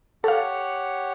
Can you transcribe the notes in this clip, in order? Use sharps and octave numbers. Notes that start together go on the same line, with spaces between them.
G4 A4 C#5 F5 F#5